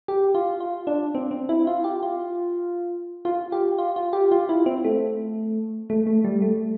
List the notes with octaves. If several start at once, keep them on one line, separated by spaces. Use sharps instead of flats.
G4
F4
F4
D4
C4
C4
E4
F4
G4
F4
F4
G4
F4
F4
G4
F4
E4
C4
A3
A3
A3
G3
A3